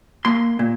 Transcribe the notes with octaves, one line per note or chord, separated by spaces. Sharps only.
A#3 C6
A#2